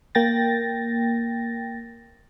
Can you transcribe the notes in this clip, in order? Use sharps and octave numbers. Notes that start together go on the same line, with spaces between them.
A#3 G5 A6 A#6